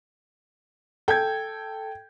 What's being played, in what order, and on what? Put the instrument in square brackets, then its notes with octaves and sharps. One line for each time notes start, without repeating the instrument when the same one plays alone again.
[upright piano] A4 G#6 [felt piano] G5 G6